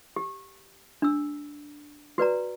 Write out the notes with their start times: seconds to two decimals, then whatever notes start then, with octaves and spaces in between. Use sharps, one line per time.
0.16 G4
1.02 D4 E6
2.18 F#4 B4 D5 A#5